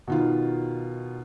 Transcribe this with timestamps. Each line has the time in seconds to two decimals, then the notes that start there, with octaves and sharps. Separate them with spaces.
0.07 B2 D#3 F4